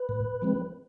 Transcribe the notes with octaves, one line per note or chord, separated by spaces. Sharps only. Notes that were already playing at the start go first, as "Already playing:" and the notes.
Already playing: B4
A2
F3 G#3 C4